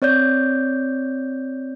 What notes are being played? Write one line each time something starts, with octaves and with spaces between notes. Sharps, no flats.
C4 C#5 D5 G6